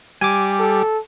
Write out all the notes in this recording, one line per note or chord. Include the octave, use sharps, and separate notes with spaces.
G3 G#5 D6
A4